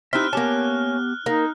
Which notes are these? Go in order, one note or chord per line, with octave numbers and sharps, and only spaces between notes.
C4 D#4 E4 G4 E5 F6 F#6
A#3 B3 C#4 G4 A5
A#3 D#4